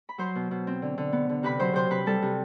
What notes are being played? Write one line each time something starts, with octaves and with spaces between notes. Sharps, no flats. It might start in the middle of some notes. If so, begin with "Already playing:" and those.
B5
F#3 C5 C6
B2
B2
C4
D3
D3
B3
D3
C3 B4 B5
F#3 C5 C6
C3 C5 C6
C3 B4 B5
G3 A4 A5
C3